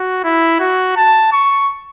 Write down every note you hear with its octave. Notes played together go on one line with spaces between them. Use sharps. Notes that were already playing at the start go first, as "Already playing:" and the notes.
Already playing: F#4
E4
F#4
A5
C#6